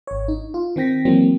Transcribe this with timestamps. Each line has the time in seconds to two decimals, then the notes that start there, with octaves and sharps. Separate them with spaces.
0.07 G#1 C#5
0.28 D#4
0.54 F4
0.76 D#3 C4 G5 A#6 B6
1.05 E3 F#3 A#3 C4